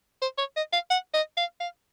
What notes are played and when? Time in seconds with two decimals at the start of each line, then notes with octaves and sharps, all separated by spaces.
0.22 C5
0.38 C#5
0.57 D#5
0.73 F5
0.90 F#5
1.14 D#5
1.37 F5
1.61 F5